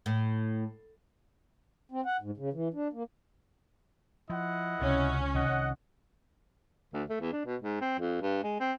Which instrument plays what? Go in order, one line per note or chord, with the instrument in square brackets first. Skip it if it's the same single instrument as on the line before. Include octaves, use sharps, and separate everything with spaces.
[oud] A2
[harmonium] C4
F#5
G#2
C#3
E3
D4
A#3
[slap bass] F3 [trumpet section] E4 D#5 F#5
[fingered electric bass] C#2 [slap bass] C3 [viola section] C#4
[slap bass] C2 C3 D#3 [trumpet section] D#5 F#5
[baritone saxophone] D2
A3
E2
D4
B2
G#2
C4
F2
G2
G#3
C4